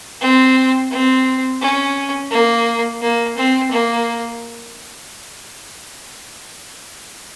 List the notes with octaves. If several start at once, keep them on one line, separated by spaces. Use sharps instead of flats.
C4
C4
C#4
A#3
A#3
C4
A#3